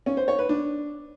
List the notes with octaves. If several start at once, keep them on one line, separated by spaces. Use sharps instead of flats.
C#4
C5
C#5
B4
D4